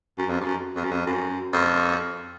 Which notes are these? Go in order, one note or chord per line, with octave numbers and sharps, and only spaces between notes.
F#2
F2
G2
F#2
F2
F#2
F2
F#2
F2